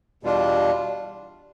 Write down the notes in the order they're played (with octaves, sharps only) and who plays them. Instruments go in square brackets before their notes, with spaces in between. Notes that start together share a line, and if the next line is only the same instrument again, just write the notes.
[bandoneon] E2 B2 G3 D4 F4